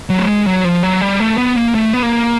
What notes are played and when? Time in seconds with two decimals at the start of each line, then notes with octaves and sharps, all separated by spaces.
0.09 F#3
0.19 A3
0.27 G#3
0.46 F#3
0.64 F3
0.83 F#3
1.01 G3
1.20 A3
1.38 B3
1.56 A#3
1.75 A3
1.93 B3
2.02 A#3